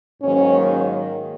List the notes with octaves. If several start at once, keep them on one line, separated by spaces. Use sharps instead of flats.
G#2 D#3 F#3 A#3 C#4